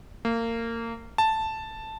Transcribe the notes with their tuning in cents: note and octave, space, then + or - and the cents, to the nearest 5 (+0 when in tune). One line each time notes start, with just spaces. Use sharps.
A#3 -25
A5 +0